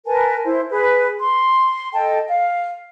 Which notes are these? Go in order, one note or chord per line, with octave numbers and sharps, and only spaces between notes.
A#4 B4 G#5 A5
E4 C5
G#4 B4
C6
A4 D#5 G5 A5
F5